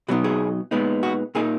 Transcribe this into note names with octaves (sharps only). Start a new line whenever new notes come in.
B2 F#3 B3 D#4 F#4
G#4
A#2 G#3 B3 D#4
F#4
A#2 A#3 D#4 G#4